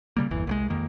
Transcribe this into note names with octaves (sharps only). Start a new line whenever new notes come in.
C#3 G3 A#3
G1 E2 E3
C2 F#3 G#3
F2 D#3 A#3